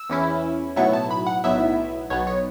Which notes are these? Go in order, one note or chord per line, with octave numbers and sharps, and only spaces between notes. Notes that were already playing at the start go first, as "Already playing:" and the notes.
Already playing: E6
E2 E3 C#4 E4
B1 A2 F#3 B3 E4 C#6
A5
B5
F#5
B1 A2 F#3 B3 E4 E5
B1 B2 B3 C#5
C#5